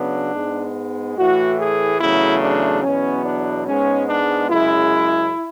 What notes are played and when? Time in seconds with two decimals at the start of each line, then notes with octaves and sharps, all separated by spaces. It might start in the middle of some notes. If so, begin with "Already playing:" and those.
Already playing: C#3 F#3 B3 D4
0.35 G#2 G#3 B3
1.18 A2 E3 A3 F#4
1.60 G#4
2.01 E2 C#3 F#3 A3 E4
2.43 D4
2.83 E2 B2 F#3 B3 C#4
3.25 D4
3.67 G#2 G#3 B3 C#4
4.09 D4
4.50 F#2 C#3 G#3 E4